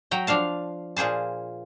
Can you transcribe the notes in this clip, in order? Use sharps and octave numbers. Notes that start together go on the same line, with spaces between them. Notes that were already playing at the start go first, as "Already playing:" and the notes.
F#3 G5 A#5
F3 D4 F5 A5
A#2 F4 G#4 C5 A5